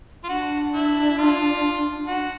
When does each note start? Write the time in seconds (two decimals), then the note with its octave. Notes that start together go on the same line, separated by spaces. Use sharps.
0.24 F4
0.28 D4 F#4
0.74 E4
1.09 E4
1.18 F4
2.07 F#4